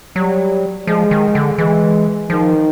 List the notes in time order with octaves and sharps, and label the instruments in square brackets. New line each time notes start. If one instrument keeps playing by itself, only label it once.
[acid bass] F#3 [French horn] G3
[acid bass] F3 [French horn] G#3
[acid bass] D#3
D3
[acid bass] E3 [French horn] G#3
[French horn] D#3 [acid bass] F3